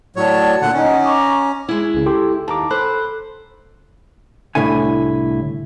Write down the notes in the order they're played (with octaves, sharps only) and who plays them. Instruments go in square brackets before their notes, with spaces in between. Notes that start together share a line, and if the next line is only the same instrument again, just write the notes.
[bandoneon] A2 F#3 C#5 [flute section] D5 A5
[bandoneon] A#2 D3 F#5
[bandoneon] C#4 [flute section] D#4 F#5
[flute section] A#5 C#6 D6
[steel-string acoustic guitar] G#3 E4
[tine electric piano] C#2 C#3
G4 A4 C6
[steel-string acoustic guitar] D#2 [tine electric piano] A5 A#5 D6
[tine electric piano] A4 B5 F#6 [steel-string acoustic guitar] C5
[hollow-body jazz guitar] C2 A2 D3 E4 G#5